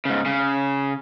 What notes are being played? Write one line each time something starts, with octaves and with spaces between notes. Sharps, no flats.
G#2 C#3
C#3